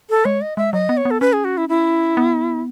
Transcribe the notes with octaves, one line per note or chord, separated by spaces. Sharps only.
A4
G#3 C#5
D#5
G#3 E5
F#3 D#5
B3
C#5
B3
A4
C#4 B4
G#4
F#4
E4
E4
B3